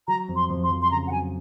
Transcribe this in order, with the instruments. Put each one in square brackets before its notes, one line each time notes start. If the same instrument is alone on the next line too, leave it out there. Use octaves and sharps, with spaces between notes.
[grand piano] F#3 [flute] A#5
[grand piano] F2
[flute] C6
[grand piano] F2
[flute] C6
[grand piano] F2
[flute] C6
[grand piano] C#3 [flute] A#5
[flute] F#5
[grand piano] F#3 [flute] G#5